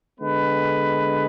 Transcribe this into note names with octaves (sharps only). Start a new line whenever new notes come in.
D3 G#3 B3 B4